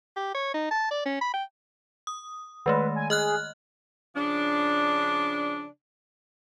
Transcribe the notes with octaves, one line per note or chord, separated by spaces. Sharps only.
G4
C#5
D#4
A5
D5
C#4
B5
G5
D#6
D#3 G#3 A3 B4
G#5
G#4 D#5 F6 F#6
C#3 F3 D4